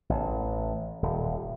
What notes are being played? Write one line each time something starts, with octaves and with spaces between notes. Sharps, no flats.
A1
D#1